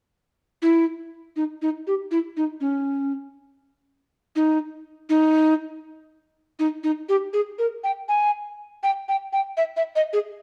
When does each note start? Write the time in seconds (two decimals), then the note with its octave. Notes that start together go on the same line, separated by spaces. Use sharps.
0.62 E4
1.36 D#4
1.62 D#4
1.87 G4
2.11 E4
2.37 D#4
2.61 C#4
4.36 D#4
5.09 D#4
6.59 D#4
6.84 D#4
7.09 G4
7.33 G#4
7.59 A#4
7.84 G5
8.09 G#5
8.83 G5
9.09 G5
9.33 G5
9.57 E5
9.77 E5
9.96 D#5
10.13 G#4